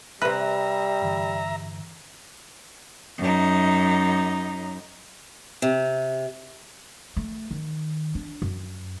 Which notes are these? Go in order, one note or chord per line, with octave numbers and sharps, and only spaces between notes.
C3 G3 B4 E5 A#5
G2 D3 E3
F#2 D#4
C3
A3
D#3
D4
F#2